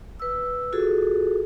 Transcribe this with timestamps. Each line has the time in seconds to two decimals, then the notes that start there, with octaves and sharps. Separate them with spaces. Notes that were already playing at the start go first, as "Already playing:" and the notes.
0.20 B4 E6
0.73 F4 F#4 G#4 A4